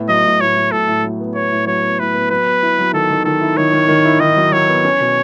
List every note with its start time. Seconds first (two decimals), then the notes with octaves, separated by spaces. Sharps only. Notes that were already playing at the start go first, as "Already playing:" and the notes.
Already playing: A2 B3
0.08 F#3 D#5
0.24 A2
0.41 A2 C#5
0.56 A2
0.71 A2 A4
0.88 A2
1.04 F#3
1.20 B3
1.35 B3 C#5
1.51 A2
1.67 F#3 C#5
1.82 B3
1.99 A2 B4
2.14 B3
2.30 F#3 B4
2.46 B3
2.63 E4
2.79 F#3
2.93 D#3 A4
3.10 D#3
3.25 D#3 A4
3.41 E4
3.57 D#3 C#5
3.73 D#3
3.89 D#3
4.05 E4
4.20 D#3 D#5
4.36 F#3
4.52 F#3 C#5
4.68 B3
4.85 C#4
5.00 B2